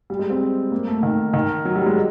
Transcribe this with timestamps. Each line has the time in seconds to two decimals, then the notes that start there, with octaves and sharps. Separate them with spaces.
0.10 G3
0.19 G#3
0.30 C4
0.72 A#3
0.87 A3
1.03 D#3
1.34 D#3
1.65 F#3
1.76 G3
1.86 G#3